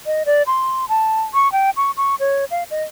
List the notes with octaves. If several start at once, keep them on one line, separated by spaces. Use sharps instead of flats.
D#5
D5
C6
A5
C#6
G5
C#6
C#6
C#5
F5
D#5